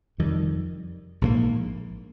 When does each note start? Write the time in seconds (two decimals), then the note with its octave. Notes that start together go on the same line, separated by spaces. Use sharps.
0.18 F1 F2 D#3 G3
1.21 A#1 G#2 D#3 A#3